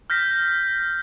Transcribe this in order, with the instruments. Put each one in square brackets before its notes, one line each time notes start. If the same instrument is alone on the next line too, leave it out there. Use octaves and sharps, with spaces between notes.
[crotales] F6 G6 A#6 B6